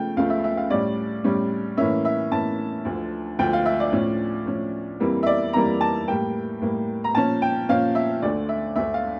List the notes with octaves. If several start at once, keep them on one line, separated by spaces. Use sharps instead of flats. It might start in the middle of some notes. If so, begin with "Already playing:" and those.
Already playing: C#3 F3 A3 G5
C#2 C#3 F3 A3 F5
E5
E5
F5
A2 G3 C#4 D5
A2 G3 C#4
A2 E3 A#3 C#4 E5
E5
A2 E3 A#3 C#4 A5
D2 D3 F3
D2 D3 F3 G5
F5
E5
D5
A2 F3 C#4
A2 F3 C#4
F2 E3 G3 A#3
E5
D5
F2 E3 G3 A#3 A#5
A5
A2 G3 A#3 G5
A2 G3 A#3
A#5
A#2 F3 C#4 A5
G5
A#2 F3 C#4 F5
E5
D2 D3 A3 D5
E5
D2 D3 A3 E5
F5